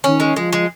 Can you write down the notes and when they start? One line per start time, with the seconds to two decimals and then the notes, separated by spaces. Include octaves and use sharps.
0.04 D#3 C#4
0.20 G#3
0.36 F3 G#3
0.53 G#3